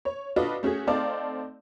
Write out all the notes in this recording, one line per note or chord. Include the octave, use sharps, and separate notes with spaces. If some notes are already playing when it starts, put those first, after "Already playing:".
C#5
D4 F4 F#4 A4 B4 D#5
A3 C#4 F#4 G#4
A3 C4 D#4 D5 F5 A5